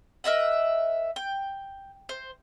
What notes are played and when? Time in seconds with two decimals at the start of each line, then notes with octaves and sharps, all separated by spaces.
0.24 A#4 D#5 E5 F#5
1.16 G5
2.09 C5